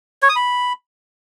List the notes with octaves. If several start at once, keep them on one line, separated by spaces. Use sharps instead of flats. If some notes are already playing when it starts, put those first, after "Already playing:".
C#5
D#6
B5